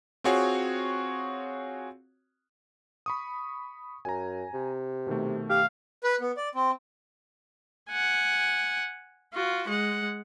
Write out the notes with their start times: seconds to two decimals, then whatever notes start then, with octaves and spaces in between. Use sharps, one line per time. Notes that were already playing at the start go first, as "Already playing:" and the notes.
0.24 C4 F4 F#4 G#4 C#5
3.06 B5 C#6 D#6
4.05 F#2 G#5 A#5
4.54 C3
5.07 B2 D#3 A3
5.50 G4 F5
6.03 B4
6.21 B3
6.37 D5
6.55 C4
7.89 F#5 G#5
9.33 F4 F#4
9.68 G#3 F#5